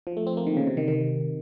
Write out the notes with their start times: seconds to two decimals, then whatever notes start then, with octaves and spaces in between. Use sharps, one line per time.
0.07 F3
0.17 A3
0.27 C4
0.37 A#3
0.47 D#3
0.57 C#3
0.67 C3
0.77 D#3
0.88 D#3